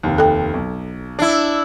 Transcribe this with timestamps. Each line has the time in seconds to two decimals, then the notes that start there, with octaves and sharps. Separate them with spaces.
0.03 F1 D#2
0.18 A4 G5
0.54 B1
1.19 D4 E4